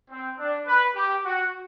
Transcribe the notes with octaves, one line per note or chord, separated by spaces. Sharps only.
C4
D4
B4
G4
F#4